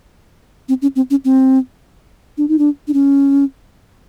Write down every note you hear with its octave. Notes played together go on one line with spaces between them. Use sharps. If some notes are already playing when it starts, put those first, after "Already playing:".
C4
C#4
C4
C#4
C4
D4
D#4
D4
D4
C#4